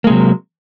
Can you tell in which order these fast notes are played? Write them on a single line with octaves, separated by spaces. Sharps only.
A#3 G#3 C3 F#3